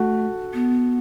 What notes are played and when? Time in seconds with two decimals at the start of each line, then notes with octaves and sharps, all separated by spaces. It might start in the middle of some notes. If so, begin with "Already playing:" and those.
Already playing: A3 F#4 A4
0.54 B3